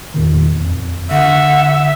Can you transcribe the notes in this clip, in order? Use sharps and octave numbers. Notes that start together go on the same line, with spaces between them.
E2 A#2 D#3
F2
D3 E5 F#5